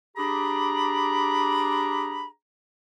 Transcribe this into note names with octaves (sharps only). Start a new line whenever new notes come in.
D4 G4 G#4 A#5 B5